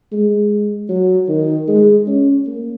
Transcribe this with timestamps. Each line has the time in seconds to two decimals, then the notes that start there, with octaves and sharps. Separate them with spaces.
0.12 G#3
0.89 F#3
1.29 D#3
1.68 G#3
2.07 C#4
2.46 A#3